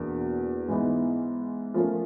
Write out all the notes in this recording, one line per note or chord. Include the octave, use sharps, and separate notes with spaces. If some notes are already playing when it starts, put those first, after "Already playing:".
Already playing: E2 B2 A#3 D4
G#2 E3 G#3 B3 D#4
F3 A3 C#4 F4 A#4